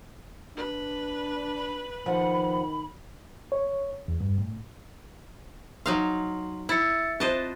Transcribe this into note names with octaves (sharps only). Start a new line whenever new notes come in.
D4 B4
B5
D#3 F3 F#5
C#5
E2
G2
A2
F#3 D#4 F5 C6
E4 E6 A6 C#7
C4 F4 C5 D#5 A5